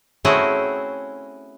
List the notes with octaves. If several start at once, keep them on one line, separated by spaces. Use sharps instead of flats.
A3 C4 C#4 E4 F#4 G#4